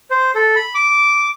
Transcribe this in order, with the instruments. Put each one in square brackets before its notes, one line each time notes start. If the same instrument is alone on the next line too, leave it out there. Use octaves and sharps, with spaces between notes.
[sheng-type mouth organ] C5
A4
B5
D6